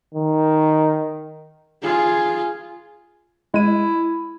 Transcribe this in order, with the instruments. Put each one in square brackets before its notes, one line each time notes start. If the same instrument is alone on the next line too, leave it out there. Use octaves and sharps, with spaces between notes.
[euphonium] D#3
[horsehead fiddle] F4 G#4
[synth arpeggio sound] G#3 D#7 [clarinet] E4